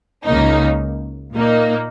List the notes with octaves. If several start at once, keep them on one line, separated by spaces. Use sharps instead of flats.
C#2 C#3 A#3 D#4
A#2 A#3 D#4